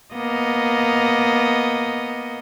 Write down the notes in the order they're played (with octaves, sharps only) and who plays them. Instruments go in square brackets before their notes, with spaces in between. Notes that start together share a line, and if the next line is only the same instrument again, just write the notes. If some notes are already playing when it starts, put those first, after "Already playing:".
[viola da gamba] A#3 B3 D#5